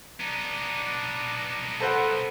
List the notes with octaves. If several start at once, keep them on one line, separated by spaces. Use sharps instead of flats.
B3 D4 D#4
A4 B4 C5 F#5